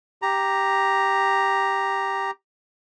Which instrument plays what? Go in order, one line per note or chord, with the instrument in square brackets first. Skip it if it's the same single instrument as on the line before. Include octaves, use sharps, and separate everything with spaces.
[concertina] G4 A#5